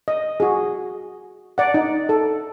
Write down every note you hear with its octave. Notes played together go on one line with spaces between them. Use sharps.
D#5
F#4 G#4
D5 F#5
D#4
A4